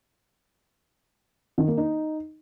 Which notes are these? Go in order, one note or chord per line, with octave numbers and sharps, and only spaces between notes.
D#3
A#3
D#4